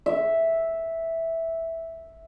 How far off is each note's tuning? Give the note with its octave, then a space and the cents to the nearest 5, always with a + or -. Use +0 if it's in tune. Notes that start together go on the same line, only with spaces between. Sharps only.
E5 -5